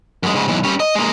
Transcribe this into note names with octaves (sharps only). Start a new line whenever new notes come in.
F#2 G#3
G#2 C#3
B1 E3
G3 C#4
D#5
G#3 A#3